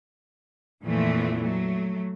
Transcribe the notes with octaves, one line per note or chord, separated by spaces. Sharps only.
F2 A#2 E3 F3 A3
F#3 A3